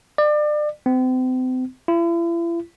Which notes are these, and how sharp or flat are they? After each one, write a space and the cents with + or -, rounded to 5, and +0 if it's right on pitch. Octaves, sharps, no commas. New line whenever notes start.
D5 +30
C4 -40
E4 +40